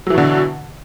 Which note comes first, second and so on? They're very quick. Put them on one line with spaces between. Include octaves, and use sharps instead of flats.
F#3 E3 B2 D3